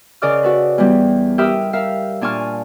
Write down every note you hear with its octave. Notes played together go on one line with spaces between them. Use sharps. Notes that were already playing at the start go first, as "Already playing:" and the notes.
C#3 A#4 D5 D#5 D6 F6
F#4 A4 B4
E2 G3
G4 A#4 E5 B5 D#6 F6
A#4 E5 F5
A#2 D4 G#5 A5 C#6 F6